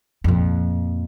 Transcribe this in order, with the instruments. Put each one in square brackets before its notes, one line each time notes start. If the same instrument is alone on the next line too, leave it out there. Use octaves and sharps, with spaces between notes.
[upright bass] F2 A#2